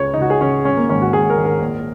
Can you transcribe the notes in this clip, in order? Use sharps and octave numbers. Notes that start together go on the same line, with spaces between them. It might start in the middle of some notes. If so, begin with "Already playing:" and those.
Already playing: C#2 C#3 C#5
D#4
C#2 F#4
G#4
C#3 C#4
G#1 C#4
A#3
G#2 D#3 C#4
F#4
G#1 G#4
A#4
G#2 D#3
A#4
A#1